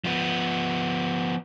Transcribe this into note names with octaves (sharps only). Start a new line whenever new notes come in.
F3 B3